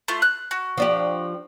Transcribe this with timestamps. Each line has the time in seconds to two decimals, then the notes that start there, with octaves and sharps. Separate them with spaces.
0.08 A3 F4
0.22 F#6
0.51 F#4
0.78 F3 D4 G4